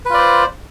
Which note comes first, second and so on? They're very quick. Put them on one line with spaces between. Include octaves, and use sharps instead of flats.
B4 F4 D5 C5